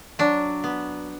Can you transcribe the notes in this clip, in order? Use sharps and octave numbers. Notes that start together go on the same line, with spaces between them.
F#3 D4
B3